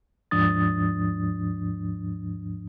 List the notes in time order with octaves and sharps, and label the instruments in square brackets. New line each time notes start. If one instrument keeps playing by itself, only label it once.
[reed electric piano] D#2 G#2 F3 D4 D#6 A6